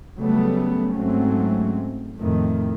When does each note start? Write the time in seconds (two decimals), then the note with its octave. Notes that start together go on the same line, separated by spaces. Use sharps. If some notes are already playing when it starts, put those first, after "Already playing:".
0.17 C#3 F#3 G3 A3 B3
0.94 G#2 F#3 A3 C4 C#4
2.18 F2 A2 D#3 A3